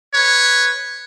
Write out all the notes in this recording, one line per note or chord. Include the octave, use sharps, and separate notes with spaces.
B4 C#5